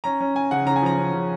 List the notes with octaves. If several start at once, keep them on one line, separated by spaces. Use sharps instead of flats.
C#4 A#5
C#4
C#4 G#5
C#3 F#5
C#3 A#5
G#5
F3 A#5
C#4
C#3